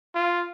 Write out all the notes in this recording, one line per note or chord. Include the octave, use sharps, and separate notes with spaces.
F4